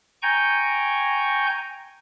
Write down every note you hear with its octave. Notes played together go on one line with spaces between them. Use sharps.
G5 G#5 A#5 C#6 G6